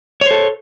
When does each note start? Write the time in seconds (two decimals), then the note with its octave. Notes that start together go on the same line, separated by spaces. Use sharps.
0.21 C#5
0.26 C5
0.31 A4